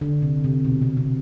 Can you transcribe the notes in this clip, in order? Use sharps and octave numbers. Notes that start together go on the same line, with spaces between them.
D3
C3
C3
B2
C3
C3